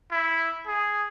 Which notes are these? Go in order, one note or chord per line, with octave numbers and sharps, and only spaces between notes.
E4
G#4